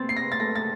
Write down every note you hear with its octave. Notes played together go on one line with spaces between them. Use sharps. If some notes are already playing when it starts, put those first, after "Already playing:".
Already playing: C4 C6 A6
C7
A#6
A6
A3 A#6
A6